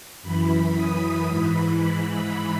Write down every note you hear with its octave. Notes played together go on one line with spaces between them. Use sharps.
F#2 E3 B5
D#6
G#2 E3 B5